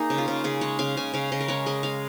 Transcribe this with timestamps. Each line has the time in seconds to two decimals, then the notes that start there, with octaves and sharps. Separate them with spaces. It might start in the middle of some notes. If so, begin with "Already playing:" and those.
Already playing: A#3 D#4 G#4 A#4
0.10 C#3
0.18 F4
0.28 C#3
0.44 C#3 G#4
0.61 G#3 C#5
0.79 C#3 F5
0.97 C#3 G#5
1.14 C#3 F5
1.32 C#3 D#5
1.41 A#4
1.48 G#3 C#5
1.66 G#3 D#5
1.83 G#3 F5